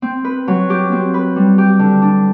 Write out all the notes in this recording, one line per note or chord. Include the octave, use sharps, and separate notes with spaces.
C4
B4
F#3
G4
C4
B4
G3
G4
D3
D4